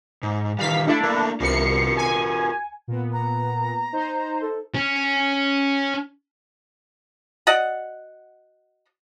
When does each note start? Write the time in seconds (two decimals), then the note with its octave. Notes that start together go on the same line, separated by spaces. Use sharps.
0.23 G#2
0.59 D#3 E3 G3 F5 B6
0.87 A3 D4 E4
1.03 A3 A#3
1.40 C2 F4 F#4 A#4 C7 C#7
1.97 G#5
2.88 A#2 B3
3.13 A#5
3.92 D#4 C5
4.41 A4
4.74 C#4
7.47 F#4 D5 D#5 F#5